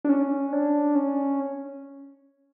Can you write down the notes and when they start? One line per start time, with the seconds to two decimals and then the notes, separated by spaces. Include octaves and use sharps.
0.05 D4
0.09 C#4
0.53 D4
0.95 C#4